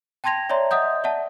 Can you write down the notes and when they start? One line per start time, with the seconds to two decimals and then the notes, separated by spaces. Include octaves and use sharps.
0.24 G5 A5 C6 G#6 A#6 F7
0.49 C#5 D5 E5 A#5 C6
0.71 D#5 E5 F#5 D#6 G6
1.04 D5 E5 F#5 A5